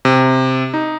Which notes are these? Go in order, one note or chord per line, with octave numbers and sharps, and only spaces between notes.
C3
D#4